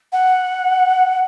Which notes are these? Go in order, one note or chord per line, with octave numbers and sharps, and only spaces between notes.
F#5